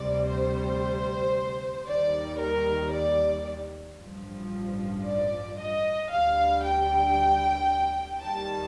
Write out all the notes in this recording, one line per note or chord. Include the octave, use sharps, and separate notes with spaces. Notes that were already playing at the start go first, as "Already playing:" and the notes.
Already playing: D2 C3 G3 D5
C5
D#2 D#3 G3 D5
A#4
D5
A1 G2 F3
D5
D#5
D2 D3 G3 F5
G5
D#2 D#3 G3 A5